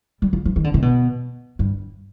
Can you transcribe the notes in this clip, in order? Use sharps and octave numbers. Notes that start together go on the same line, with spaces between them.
G3
F3
F3
D#3
D3
C3
B2
G2